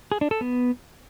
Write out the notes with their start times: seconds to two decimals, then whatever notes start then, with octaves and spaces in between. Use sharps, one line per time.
0.12 G#4
0.21 D4
0.31 A4
0.41 B3